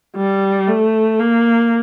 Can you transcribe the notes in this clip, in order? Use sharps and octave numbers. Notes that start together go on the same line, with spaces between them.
G3
A3
A#3